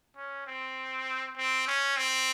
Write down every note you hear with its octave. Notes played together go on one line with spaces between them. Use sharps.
C#4
C4
C4
C#4
C4